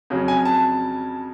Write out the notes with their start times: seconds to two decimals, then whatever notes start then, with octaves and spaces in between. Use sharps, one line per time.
0.10 F2 C#3 F#3
0.28 G#5
0.45 A5